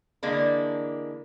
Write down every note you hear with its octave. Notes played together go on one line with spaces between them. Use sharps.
D3 E3 G#3 A#3 D4